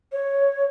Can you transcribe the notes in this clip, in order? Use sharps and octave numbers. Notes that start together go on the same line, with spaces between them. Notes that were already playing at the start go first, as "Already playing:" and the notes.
C#5